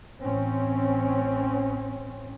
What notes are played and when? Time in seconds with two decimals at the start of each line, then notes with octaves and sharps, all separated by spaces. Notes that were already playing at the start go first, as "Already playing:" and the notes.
0.21 A1 C4 C#4